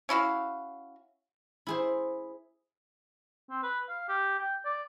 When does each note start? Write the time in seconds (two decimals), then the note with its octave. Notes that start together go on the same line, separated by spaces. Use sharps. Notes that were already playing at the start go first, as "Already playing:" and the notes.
0.09 C#4 E4 F#4 F5
1.67 E4 G#4 C5
3.50 C4
3.63 B4
3.89 F5
4.09 G4
4.39 G5
4.65 D5